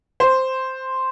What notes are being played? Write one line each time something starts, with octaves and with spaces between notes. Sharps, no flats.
C5